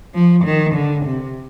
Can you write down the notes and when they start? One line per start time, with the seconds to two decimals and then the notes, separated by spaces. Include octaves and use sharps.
0.14 F3
0.45 D#3
0.75 D3
1.06 C3